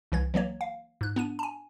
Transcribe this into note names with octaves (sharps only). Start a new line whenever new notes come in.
C2 E3 G#6
E3 F#3 A#3 C#5
F5
G#2 F#6
B3 D4 D#7
G#5 A5